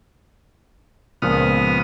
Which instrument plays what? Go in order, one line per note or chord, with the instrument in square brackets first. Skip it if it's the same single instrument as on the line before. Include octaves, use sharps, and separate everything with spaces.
[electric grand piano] C#2 A#2 F3 [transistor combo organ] B3 D#6 F6